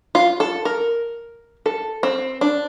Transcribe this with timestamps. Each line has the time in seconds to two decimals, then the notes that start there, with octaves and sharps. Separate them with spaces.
0.15 F4
0.40 A4
0.65 A#4
1.66 A4
2.03 C4
2.41 D4